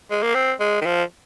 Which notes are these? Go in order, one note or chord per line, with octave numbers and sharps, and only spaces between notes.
G#3
A#3
C4
G#3
D#3
F3